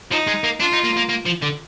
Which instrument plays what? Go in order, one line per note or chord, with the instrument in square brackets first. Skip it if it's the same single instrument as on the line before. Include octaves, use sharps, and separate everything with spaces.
[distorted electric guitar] F3 [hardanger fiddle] D#4
[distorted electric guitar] G#3
A#3
[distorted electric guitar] D4 [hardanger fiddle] F4
[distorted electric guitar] D#4
A#3
A#3
A#3
F3
D3